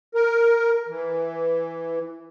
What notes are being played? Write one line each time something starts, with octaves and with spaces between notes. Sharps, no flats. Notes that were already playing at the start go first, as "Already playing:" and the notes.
A#4
E3